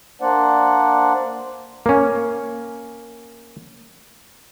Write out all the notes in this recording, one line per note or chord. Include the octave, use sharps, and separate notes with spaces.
A#3 D4 C5 D5 F#5
A#3 C#4